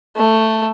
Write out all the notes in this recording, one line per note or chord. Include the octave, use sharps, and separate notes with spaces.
A3